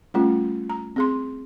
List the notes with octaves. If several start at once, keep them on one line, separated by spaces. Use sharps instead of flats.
G3 A3 C#4 F4
A#5
C4 G#4 C6